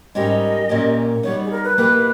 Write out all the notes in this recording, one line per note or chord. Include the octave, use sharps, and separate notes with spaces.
G#2 G3 C#4 G4 A#4 D#5
A#2 A#3 C#4 G4
G3 B3 D#4 C#5
G#4
A#4
B4
B2 A#3 E4 G4 B4